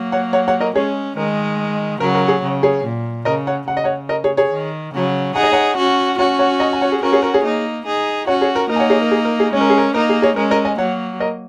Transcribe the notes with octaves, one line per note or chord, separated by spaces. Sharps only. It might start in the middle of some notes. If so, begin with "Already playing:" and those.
Already playing: F#3 A#3
C#5 F#5
C#5 F#5
C#5 F#5
A#4 D#5
G#3 C#4 G#4 C#5
D#3 G#3 A#4
C#3 F#3 A#4
A#4
G#4
C#3
G#4 C#5
A#2
C#3 A#4 D#5
C#5 F#5
C#3 F#5
D#5
C#5 F#5
A#4 D#5
G#4 C#5
G#4 C#5
D#3
C#3 F#3
D#4 G#4 F#5
D#5
C#5 F#5
C#4 F#4
C#4 F#4 C#5 F#5
C#5 F#5
D#5 G#5
G#5
C#5 F#5
G#4
C#4 F#4 A#4
G#4 C#5
A#4
G#4 C#5
A#3 D#4
D#4 G#4
C#4 F#4 C#5 F#5
G#4 C#5
A#4
A#3 D#4 A#4
G#5
C#5 F#5
G#4 C#5
A#4
G#4
A#4
G#4
G#3 C#4 C#5
A#4
G#4
A#4
A#3 D#4 A#4
G#4
G#4 C#5
G#3 C#4 A#4
A#4 D#5
D#5 G#5
F#3 A#3 C#5 F#5
A#4 D#5